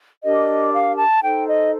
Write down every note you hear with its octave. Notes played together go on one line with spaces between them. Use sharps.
D4 G4 A#4 D#5
F5
A5
D#4 A4 C5 G5
D#5